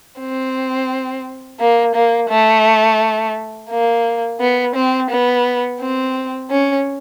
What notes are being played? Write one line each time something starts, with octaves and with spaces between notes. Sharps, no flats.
C4
A#3
A#3
A3
A#3
B3
C4
B3
C4
C#4